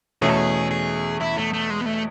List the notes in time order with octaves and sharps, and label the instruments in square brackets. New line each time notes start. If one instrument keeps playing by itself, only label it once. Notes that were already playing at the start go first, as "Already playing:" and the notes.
[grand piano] E2 B2 A3 C#4 [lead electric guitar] G#4
[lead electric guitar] A4
G#4
G#4
E4
A3
A3
G#3
B3
A3